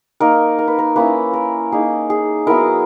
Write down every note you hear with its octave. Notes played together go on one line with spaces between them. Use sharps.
A#3 D#4 A#4
A#4
B4
A#4
A#3 C#4 E4 B4
A#4
A#3 D#4 G#4
G#4
F#3 B3 E4 A#4